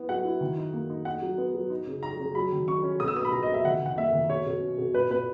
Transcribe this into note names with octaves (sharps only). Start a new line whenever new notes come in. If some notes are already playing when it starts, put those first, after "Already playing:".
Already playing: B3 E4
F#3 F#5
E4
D#3
D#4
A#3
D#4
D#4 F#5
F#3
B3
F#3
D#4
C#3
D#4 A#5
C#3
F#3 B5
D#3
C#4 C#6
C#4
B2 D#6
E6
B3 D#6
B5
B2 A#5
D#5
B2
E5
D#3 F#5
D#3 F#5
A#3 E5
D#3
B2 C#5
B2
C#4
B2
A#2 B4
A#2 B4